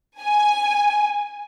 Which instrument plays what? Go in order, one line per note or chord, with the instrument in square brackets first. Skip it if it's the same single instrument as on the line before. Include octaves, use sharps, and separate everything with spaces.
[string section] G#5